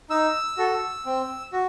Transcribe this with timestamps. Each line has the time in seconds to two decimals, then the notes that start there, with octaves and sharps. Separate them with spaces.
0.10 D#4 E6
0.57 F#4 A4
1.06 C4
1.53 F#4